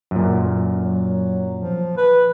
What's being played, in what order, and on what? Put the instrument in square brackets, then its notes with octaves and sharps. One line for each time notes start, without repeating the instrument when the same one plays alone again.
[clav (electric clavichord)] F#2 A#2
[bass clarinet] F#3
F3
B4